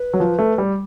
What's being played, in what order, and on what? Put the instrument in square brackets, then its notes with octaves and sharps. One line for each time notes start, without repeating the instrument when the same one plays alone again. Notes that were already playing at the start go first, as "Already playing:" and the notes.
Already playing: [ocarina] B4
[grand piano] F#3
F3
A3
G3